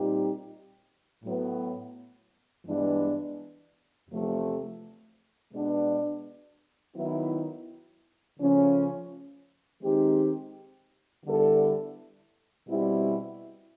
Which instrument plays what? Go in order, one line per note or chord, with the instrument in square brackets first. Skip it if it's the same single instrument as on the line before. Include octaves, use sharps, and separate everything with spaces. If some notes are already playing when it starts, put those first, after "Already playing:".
Already playing: [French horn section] A#2 G3 C4 D#4 G4
A2 F#3 B3
G2 E3 G#3 B3 D4
E2 C3 F3 A3
B2 G#3 B3 D4
D#3 F#3 B3 E4
C#3 F3 A3 C#4
D#3 G#3 C4 D#4 G4
D3 G3 B3 E4 A4
B2 G3 C4 E4